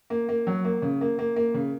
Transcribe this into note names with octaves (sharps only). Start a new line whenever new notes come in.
A#3
A#3
F#3
A#3
C#3
A#3
A#3
A#3
C#3